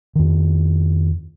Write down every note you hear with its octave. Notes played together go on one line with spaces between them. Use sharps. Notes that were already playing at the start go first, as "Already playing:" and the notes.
F2 D#3